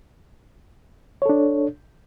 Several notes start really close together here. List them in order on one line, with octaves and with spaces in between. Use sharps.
C#5 A4 D4